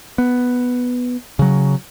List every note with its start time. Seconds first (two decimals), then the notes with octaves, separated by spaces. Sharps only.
0.18 B3
1.39 C#3 F#3